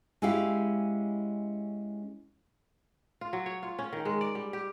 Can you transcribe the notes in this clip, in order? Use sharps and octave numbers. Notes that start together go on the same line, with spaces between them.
G#3 C#4 E4 G4 F5
F4
F#3
C#5
F4
C#4
D#3
G#3
D5
G3
G4